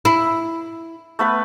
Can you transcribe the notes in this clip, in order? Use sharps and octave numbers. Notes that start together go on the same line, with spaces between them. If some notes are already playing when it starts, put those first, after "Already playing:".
E4
A3 B3 B4